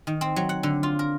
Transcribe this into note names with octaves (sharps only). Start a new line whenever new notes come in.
D#3
C4
F#3
F#5
D3
F4
A#4